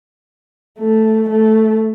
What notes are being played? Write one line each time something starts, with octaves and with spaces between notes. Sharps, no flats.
A3
A3